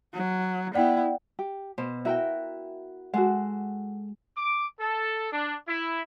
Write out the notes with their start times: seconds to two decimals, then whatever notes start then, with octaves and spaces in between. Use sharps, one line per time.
0.14 F#3
0.74 B3 E4 D5 F#5 G5
1.39 G4
1.78 B2 C5
2.05 E4 F#4 A#4 E5 G5
3.14 G#3 F#4 A4 F#5
4.36 D6
4.79 A4
5.32 D4
5.67 E4